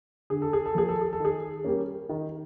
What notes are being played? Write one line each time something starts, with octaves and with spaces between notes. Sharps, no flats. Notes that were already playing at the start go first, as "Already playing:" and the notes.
D3 G#4
A4
G#4
A4
F3 A#3 G#4
A4
G#4
A4
D#3 G#4
G3 A#3 C#4
D#3